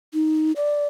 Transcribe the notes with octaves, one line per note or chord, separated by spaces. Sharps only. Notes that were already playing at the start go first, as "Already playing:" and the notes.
D#4
D5